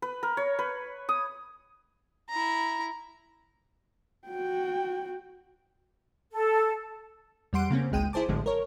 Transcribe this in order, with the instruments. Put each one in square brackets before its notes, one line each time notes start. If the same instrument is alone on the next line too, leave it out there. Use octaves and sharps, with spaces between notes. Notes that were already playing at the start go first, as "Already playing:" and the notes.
[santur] B4
A#4
C#5
B4
D#6
[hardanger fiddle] E4 A#5
[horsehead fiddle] F#4 G5
[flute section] A4
[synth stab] E2 G3 F#5 C6 D7
C#3 A#3 C4 C#4
G#1 C#2 G#3 G5 D#7
E4 G#4 C5 A5 D6
A1 E2 A2 D3 F3 G#3
A#4 C#5